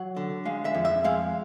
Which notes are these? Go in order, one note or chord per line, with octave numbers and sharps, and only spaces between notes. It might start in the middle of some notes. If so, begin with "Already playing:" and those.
Already playing: F#3 F#5
D3
G#3 F5
E5
F2
E5
G#3 F5